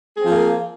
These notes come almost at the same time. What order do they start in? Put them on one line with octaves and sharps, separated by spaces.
G#4 C4 F3 A#3